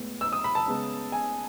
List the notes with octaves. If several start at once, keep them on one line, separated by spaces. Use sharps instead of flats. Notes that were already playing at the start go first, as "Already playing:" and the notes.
Already playing: A2 G#3 B3
E6
D#6
B5
A5
C#3 G#3 B3
G#5